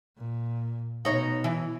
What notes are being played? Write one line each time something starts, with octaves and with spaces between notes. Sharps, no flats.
A#2
B2 D#4 C#5
E3